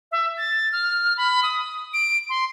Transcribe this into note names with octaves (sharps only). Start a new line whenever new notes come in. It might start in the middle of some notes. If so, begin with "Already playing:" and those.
E5
A6
F6
B5
D#6
D7
C6